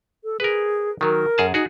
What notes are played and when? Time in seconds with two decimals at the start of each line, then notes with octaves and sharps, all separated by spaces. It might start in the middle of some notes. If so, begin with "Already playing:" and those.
0.24 A4
0.40 G#4 A#4 B4
1.01 D#3 F#3 A#4
1.38 F#2 G#4 A5
1.54 D#4 F#4 G#4